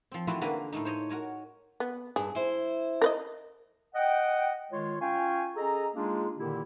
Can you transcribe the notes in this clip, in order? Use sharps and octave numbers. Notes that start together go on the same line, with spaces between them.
F3 C4
E3 A3 C4 F4 F#4 B4
D3 A#3 F4 B4 G#5 A#5
A2 A3 D#4
C5 C#5 D#5
F#4 A#4 C#5 G#5
B3
G2 G#4
E4 C5
A#4 B4 D#5
D#5 F#5 G5
D#3 G#3 F4 C#5
C#4 F4 F5 G5 G#5 C#6
C#4 G#4 A4 D#5 A#5
G#3 A#3 D4 D#4 F4 G#4
A#2 D3 D#3 A#3 E4 G4